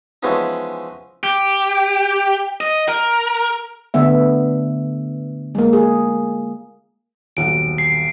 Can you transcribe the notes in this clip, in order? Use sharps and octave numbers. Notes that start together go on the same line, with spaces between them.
E3 F3 G#3 B3 C#4 D#4
G4
D#5
A#4
D3 A3 B3 E5
G#3 A#3
G#4
D#1 B1 F#5 D7
C7